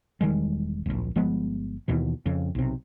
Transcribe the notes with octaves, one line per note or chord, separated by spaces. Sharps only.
E1 D#3 G3 G#3
D1 A#1
G1 F3 G#3 B3
D#2 B2 E3
F2 C#3
B1 C3